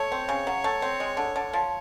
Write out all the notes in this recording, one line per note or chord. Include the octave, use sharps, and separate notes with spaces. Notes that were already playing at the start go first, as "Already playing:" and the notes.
Already playing: A3 C#5
C4
C#3
F#3
A3
C4
G#3
D3
D3
F3